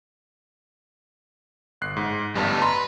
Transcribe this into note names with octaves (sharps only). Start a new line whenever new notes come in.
G1 F#6 C7
G#2
A1 G2 G3 B3 A5
B4 A#5 C6